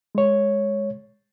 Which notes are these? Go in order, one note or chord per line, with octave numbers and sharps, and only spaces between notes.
G#3 C#5